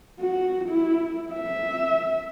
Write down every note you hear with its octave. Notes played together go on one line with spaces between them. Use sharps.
F#4
E4
E5